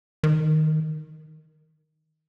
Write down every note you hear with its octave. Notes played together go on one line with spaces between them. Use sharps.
D#3